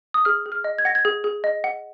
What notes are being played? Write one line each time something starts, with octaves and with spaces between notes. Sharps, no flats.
D#6
G#4 F6
G#4
F6
D#5
G#6
F#5 A#6
G#6
G#4
G#4
D#5
F#5